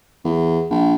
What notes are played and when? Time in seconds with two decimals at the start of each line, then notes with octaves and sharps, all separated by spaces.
0.24 E2
0.70 A#1